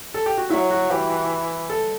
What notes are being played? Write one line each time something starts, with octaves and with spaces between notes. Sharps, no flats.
A4
G4
F#4
F#3 E4
F#4
E3 G4
A4